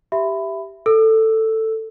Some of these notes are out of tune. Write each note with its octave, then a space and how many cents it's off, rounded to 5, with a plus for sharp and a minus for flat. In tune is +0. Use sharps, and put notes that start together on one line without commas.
G4 +0 E5 +5 B5 +15
A4 +10 E6 +0